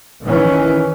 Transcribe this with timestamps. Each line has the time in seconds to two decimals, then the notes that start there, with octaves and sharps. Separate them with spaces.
0.23 D#3 E3 C#4